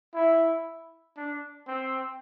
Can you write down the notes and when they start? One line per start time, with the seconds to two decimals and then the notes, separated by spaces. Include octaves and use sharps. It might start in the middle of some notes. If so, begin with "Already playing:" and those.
0.14 E4
1.16 D4
1.67 C4